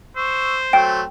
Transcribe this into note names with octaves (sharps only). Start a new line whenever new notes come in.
C5 C#6 E6
F#3 A3 C4 G5